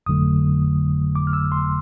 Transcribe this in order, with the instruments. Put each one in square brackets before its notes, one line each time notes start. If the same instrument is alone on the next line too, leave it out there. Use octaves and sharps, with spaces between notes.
[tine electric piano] G1 F2 D3 F#3 A3 D#6
D6
F6
E6
C6